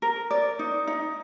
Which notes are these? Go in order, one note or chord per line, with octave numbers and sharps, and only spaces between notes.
A#4
D5
D#4
D#4